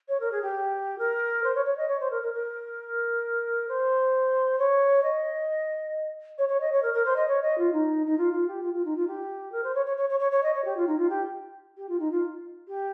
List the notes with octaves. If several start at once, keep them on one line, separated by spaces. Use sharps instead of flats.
C#5
A#4
G#4
G4
A#4
C5
C#5
C#5
D#5
C#5
C5
A#4
A#4
A#4
C5
C#5
D#5
C#5
C#5
D#5
C#5
A#4
A#4
C5
D#5
C#5
D#5
F4
D#4
D#4
F4
F4
G4
F4
F4
D#4
F4
G4
A#4
C5
C#5
C#5
C#5
C#5
C#5
C#5
D#5
C#5
G4
F4
D#4
F4
G4
G4
F4
D#4
F4
G4